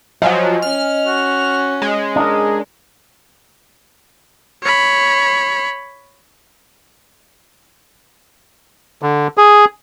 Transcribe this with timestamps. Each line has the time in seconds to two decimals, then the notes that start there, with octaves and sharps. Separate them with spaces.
0.22 F3 F#3 D#5 G#5
0.62 C#4 F6
1.05 F#4
1.82 G#3
2.16 D4 A#4 D#5
4.63 C#5 B5
9.02 D3
9.38 G#4